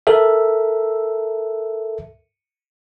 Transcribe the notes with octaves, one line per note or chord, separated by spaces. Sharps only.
A4 A#4 E5